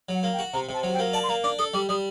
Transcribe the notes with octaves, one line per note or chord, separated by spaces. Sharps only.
F#3
F#5
A#3
G5
F#4
C3 A#5
C3
A5
F#3
G5
A#3
D5 A5
C6
A#3 A#5
D4 D6
A4 D#6
G3 D6
G3 D#6